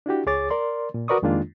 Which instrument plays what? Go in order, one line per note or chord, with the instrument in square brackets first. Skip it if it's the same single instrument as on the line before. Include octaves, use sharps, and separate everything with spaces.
[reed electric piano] D4 E4 F#4 G4
C#2 G#4 C#5 D6 A6
A#4 D5 C6
A#2
F#4 A#4 B4 D5 C#6 D#6
F2 D#3 G#3 A#3 D4 F4